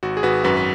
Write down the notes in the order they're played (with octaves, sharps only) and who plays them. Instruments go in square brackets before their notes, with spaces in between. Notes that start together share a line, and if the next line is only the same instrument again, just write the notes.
[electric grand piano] G#1 F#4
G#4
G#1 F#4 B4
F#2 F#4 B4
B4